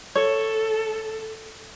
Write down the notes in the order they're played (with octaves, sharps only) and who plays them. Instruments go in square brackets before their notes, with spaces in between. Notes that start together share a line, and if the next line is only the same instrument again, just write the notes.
[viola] A4 [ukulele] C#5